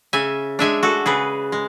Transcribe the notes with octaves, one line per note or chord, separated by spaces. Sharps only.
C#3 E5 G#5
G#3 D4 E5 G#5
F#4 A4
C#3 G#4 B4
G#3